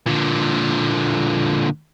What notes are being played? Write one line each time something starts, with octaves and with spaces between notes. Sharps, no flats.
A#2 D3